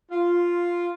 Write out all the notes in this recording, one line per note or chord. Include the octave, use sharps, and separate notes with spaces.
F4